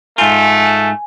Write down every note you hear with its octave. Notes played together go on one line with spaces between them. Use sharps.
G#2 A3 F4 G#5